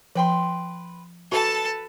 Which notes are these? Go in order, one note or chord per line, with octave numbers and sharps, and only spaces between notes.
F3 B4 G5 C6
F#4 A4 B4 A5